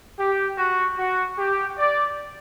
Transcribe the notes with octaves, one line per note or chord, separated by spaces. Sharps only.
G4
F#4
F#4
G4
D5